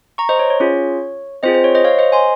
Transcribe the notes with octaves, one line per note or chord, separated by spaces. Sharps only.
A#5 C#6
C5 D#5
C#5
C#5
C#4 F4 G#4
C4 F4 G#4 C5 D#5
C5
C#5
C5 D#5
C#5 F5
C5 D#5
G#5 C6